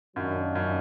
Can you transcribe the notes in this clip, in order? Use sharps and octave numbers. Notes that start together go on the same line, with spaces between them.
F#2 D#3 F#3 D4 F4
F#2